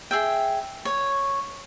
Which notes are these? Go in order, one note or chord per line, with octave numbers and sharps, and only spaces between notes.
G#4 E5 G5
C#5